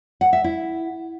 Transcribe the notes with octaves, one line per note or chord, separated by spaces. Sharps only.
F#5
E5
E4